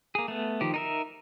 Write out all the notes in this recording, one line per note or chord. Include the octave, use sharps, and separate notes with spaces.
A#3 G#4
A3 B3
D#3 F3 G4
D#4 A#4 E5